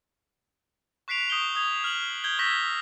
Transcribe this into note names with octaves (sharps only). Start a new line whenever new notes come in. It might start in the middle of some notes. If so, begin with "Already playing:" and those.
C#6 F#6 B6 C7 D7 F7
C#6 D#6 G6 C7 G7
D#6 G#6 F7
F6 F#7
G6 G#6 G7
C#6 E6 G6 G#6 A#6 B6